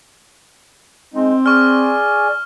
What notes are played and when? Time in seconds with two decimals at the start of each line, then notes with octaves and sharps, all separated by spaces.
1.14 G#3 C4 D#4
1.46 G#4 D5 G#5 C#6 F6